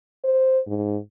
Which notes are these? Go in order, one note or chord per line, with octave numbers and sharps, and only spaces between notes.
C5
G#2